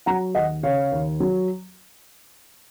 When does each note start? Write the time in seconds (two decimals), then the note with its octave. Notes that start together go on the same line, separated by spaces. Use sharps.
0.06 F#3 F#5 A#5
0.35 D#2 D#5 F#5
0.63 C#3 C#5 F5
0.92 D#2
1.20 F#3